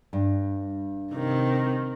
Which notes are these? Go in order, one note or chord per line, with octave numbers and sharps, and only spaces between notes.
G2
C3 D#3